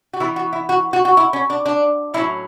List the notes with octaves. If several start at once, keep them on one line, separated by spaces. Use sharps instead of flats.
F#4
E3 B3 E4
F#4
E4
F#4
F#4
F#4
E4
C#4
D4
D4
A2 F#3 C#4 E4